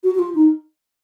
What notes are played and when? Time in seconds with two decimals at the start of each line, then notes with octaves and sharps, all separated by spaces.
0.04 F#4
0.15 F#4
0.19 F4
0.35 D#4